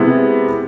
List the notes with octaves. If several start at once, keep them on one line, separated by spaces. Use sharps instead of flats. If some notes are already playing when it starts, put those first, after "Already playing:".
Already playing: C3 G#3 B3 E4